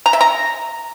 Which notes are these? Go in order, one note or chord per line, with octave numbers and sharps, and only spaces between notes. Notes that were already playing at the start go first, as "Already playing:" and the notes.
A#5
E5
A#5